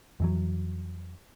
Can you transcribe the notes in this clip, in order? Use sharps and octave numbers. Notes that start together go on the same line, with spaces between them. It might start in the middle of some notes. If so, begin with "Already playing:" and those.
F2 E3 F#3